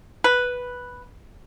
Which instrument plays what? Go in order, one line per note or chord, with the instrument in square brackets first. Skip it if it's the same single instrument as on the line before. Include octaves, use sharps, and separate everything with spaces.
[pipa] B4